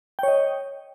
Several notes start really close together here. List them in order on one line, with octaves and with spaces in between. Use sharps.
G5 C#5 D#5